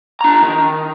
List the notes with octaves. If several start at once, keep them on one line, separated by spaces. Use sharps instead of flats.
D4 A#5
D#3